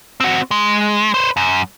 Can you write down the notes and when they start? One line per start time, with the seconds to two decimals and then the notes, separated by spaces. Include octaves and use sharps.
0.20 C4 F#4
0.51 G#3
1.14 B4 C5
1.37 F#2